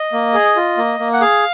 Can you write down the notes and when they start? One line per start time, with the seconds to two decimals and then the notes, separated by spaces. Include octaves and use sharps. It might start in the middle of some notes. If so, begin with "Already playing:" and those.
Already playing: D#5
0.13 A#3
0.34 G#4
0.56 F4
0.78 A#3
1.00 A#3
1.13 F#5
1.21 G#4 F5